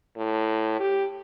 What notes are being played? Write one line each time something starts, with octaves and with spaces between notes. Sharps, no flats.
A2
G4